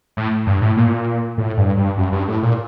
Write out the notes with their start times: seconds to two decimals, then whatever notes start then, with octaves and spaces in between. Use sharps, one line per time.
0.17 A2
0.47 G2
0.61 A2
0.77 A#2
1.38 A2
1.57 G2
1.77 G2
1.98 F#2
2.12 G2
2.28 A2
2.43 A#2